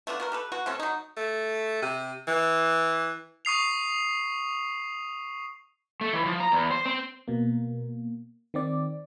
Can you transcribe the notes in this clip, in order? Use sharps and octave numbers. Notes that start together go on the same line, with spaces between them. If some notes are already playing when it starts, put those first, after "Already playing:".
A3 B3 D4 F4
B3 F#4 A#4
G4 A4 B4
B2 F#4
C3 A3 C4 C#4
F#3 D#4
A3
C3
E3
C#6 D#6 C7 F7
A3
E3
F3
A#5
E2
C5
C4
B2 A#3
D#3 C4 D5